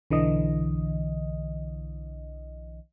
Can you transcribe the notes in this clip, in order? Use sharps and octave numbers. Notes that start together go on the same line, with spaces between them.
B1 D3 E3 D#5